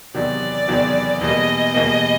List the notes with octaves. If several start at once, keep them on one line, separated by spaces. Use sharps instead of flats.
E2 C3 D#3 F#3 D5
E2 C3 D#3 F#3
E2 B2 G3 A#3 D#5
E2 B2 G3 A#3